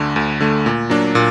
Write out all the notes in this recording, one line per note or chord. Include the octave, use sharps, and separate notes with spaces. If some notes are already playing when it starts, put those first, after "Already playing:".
Already playing: D2 D3 A3
D2
D3 A3
A#2
F#3 A#3 D4
A#2